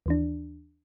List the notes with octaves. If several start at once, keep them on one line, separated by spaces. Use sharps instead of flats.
D#2 E3 D4